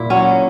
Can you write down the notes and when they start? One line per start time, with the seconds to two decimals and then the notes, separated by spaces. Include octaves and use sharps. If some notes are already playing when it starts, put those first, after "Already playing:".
Already playing: A#2 E4
0.10 F#3 C#4